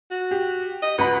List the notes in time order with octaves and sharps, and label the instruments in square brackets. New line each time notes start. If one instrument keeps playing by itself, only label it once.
[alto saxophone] F#4
[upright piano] G4
[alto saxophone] D#5
[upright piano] C#2 F#4 B5 [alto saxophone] B4